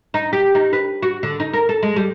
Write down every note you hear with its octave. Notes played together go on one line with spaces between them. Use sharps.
D#4
G4
D#4
B4
F#4
D3
D#4
A#4
A4
G#3
G3